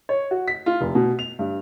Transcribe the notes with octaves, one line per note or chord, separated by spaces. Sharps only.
C#5
F#4
B6
F4
F1
B2
F7
G2